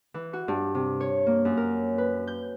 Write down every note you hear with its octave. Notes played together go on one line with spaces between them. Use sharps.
E3
F#4
G2
C3
C#5
A#3
F#2
A#4
B4
G6